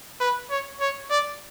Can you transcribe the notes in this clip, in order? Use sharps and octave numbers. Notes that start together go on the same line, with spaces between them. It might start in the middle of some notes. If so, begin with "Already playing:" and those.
B4
C#5
C#5
D5